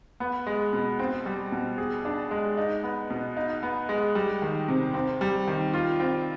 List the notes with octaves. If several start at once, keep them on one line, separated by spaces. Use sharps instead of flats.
B3
G#3
B2
C4
G3
B2
G#4
D4
G#3
D#4
B3
B2
D#4
B3
G#3
G3
D#3
C3
C4
G3
D#3
F4
C4